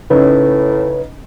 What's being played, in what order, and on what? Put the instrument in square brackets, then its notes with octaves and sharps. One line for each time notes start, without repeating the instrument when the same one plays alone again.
[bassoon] A2 [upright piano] C#3 C#4 D#4 [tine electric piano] B4